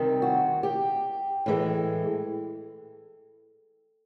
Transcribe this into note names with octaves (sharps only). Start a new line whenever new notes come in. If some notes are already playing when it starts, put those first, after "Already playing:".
Already playing: C3 D#3 G3 C4
F#4
G4
A2 E3 G#3